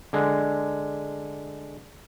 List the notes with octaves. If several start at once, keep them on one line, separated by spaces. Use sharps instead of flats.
D3 G#3